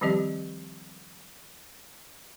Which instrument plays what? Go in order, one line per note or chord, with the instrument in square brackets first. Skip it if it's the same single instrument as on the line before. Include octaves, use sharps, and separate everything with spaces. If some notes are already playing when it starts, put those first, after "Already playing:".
[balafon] D#3 F3 G3 C4 G4 D#5